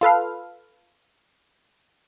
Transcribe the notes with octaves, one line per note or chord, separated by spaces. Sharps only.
F4 A4 B4 F5